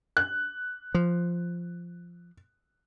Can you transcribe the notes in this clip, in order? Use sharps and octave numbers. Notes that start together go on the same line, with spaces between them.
F#6
F3